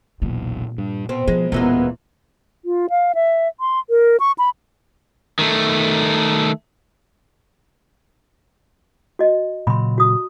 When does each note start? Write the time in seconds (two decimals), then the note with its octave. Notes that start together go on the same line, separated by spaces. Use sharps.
0.22 E1 B1 A#2
0.78 G2
1.09 B2 C4
1.28 F3 G#3
1.52 D#1 A#2 E3 G#3 B3
2.65 F4
2.90 F5
3.15 E5
3.60 C6
3.90 A#4
4.20 C#6
4.38 B5
5.39 D#3 A3
9.19 F#4 D#5
9.67 A#2 C#3 F#3 B5 C6
9.98 F#4 D#6